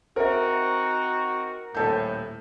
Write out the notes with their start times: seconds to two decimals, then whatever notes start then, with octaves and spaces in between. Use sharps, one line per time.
0.16 C4 D#4 F#4 A#4 C5 E5
1.75 D#1 A2 A4 G6